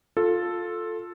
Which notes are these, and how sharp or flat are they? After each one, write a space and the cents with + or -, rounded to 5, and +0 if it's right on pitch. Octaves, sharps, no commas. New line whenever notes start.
F4 +15 A4 +0